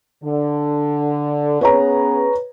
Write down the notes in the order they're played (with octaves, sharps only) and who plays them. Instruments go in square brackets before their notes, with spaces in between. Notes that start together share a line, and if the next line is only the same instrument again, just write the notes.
[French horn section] D3
[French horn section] B3 C#4 G#4 [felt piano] B4 C#5 A#5